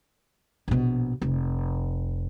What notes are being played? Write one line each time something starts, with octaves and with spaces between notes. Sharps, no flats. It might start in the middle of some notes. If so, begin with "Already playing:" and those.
A#1 B2
F1